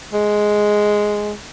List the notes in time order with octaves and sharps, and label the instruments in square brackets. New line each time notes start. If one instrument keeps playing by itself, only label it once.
[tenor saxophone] G#3